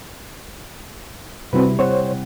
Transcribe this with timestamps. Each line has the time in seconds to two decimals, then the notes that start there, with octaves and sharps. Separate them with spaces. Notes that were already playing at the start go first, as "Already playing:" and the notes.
1.53 C3 G3 C4 E4 F#4 B4
1.79 C4 C5 C#5 F#5